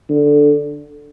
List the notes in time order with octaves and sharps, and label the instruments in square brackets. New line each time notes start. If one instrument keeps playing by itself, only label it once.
[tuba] D3